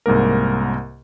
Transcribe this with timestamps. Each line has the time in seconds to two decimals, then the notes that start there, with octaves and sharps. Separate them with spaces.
0.06 C2 G#2 A#3 A#4